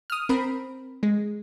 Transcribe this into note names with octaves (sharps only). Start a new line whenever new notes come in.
D#6 F6
C4 A#4 B5
G#3